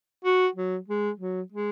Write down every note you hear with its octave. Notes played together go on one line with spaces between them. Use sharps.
F#4
F#3
G#3
F#3
G#3